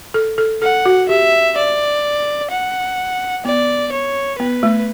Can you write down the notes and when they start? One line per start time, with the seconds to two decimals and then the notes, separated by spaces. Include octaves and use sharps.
0.14 A4
0.38 A4
0.62 A4 F#5
0.86 F#4
1.09 G4 E5
1.57 D5
2.51 F#5
3.45 B3 D5
3.92 C#5
4.39 B3 B4
4.63 A3